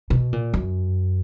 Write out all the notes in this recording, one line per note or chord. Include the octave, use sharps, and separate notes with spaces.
B2
A#2
F#2